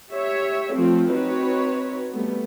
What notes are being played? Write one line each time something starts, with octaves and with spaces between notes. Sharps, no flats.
G4 C#5 E5
F3 A3 C4 F4
C4 D#4 F#4 B4 C#5
G3 A3 B3